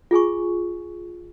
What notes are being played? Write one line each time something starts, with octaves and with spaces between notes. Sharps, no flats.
F4 G#4 G#5 C#6